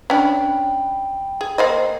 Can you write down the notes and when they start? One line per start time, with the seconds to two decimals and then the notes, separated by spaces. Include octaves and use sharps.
0.10 C#4 D4 G5 B5
1.41 G#4
1.58 A#3 C5 D#5